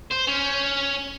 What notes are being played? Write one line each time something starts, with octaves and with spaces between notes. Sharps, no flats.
C5
C#4